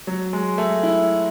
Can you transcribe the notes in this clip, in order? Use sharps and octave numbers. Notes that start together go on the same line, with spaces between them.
F#3
G#3
A3
E4